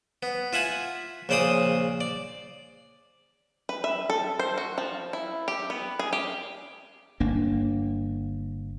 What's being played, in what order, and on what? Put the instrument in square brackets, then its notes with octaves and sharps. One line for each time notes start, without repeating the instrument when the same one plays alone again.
[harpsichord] B3
F4 E5 F#5 G#5
A#1 C#3 C5 D5 G5 D#6
D5
[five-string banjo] B4
E5
A4
C5
F#4
F3
E4
G4
B3
G#4
G4
[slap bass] G1 A#3 D4